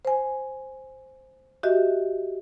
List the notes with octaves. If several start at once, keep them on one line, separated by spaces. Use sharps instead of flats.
C5 G#5
F#4 G4 D#5 E5